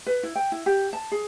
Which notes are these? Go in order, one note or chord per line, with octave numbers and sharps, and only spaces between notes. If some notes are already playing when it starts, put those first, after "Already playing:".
B4
E4
G5
E4
G4
A5
G#4